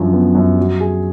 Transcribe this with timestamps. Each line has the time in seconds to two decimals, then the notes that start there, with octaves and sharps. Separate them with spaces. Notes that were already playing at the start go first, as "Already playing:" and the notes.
Already playing: F#2 D3 F3
0.13 B3
0.35 F#2
0.58 F#3
0.80 G#4